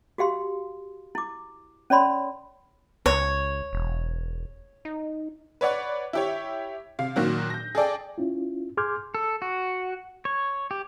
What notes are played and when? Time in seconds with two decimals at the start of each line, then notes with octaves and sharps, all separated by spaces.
0.18 F#4 G4 F5 C6
1.15 E4 D6
1.90 C#4 C#5 D5 B5 C6
3.06 C#2 C#5
3.73 E1
4.85 D#4
5.61 B4 C#5 D5 F#5
6.13 E4 G4 C#5
6.99 C3 F5
7.16 A#2 D#3 F#3 F#4
7.50 G6 A#6
7.75 G#4 A4 D5 G5
8.18 C#4 E4 F4
8.77 G#4 C6 D6 F6 G6 G#6
9.15 A4
9.42 F#4
10.25 C#5
10.71 G4